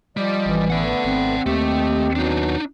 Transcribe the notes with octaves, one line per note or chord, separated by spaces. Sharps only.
F3 G3 D5 D#5
A1 E3
A3 B3 D5 F#5
G#1 C4
D#2 A3 G4 D#5
B2 F#3 D4 D#4